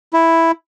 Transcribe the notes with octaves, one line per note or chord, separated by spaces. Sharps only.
E4